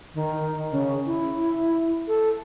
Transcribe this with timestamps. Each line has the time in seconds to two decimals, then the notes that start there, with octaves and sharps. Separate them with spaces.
0.14 D#3
0.71 C#3
1.07 E4
2.08 A4